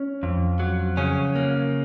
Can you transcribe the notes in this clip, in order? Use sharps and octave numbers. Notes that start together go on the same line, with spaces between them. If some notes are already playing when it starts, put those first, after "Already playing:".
Already playing: C#4
F2
F#3
C#3 C#4
A#3